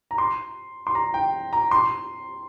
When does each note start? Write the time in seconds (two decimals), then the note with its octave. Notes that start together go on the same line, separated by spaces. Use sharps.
0.11 A#5
0.18 C6
0.87 C6
0.95 A#5
1.14 G5
1.53 A#5
1.71 C6